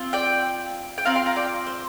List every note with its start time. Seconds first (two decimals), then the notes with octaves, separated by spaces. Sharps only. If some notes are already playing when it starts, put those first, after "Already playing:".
Already playing: C4 F4
0.13 D5 G5
0.98 G5
1.05 C4 F4 F5 A#5
1.15 G5 C6
1.26 F5 A#5
1.36 D5 G5
1.67 C5